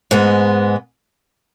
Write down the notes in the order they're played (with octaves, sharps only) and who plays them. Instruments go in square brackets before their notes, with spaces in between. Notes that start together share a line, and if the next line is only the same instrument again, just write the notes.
[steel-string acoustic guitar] G#2 G#3 B3